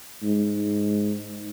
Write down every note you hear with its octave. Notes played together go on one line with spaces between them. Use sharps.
G#2